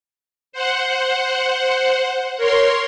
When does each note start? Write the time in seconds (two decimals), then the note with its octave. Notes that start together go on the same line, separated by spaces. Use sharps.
0.52 C5 F#5
2.37 A#4 C#5 C6